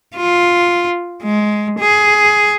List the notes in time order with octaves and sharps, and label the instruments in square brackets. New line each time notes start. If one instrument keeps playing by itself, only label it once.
[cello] F4
G#3
G#4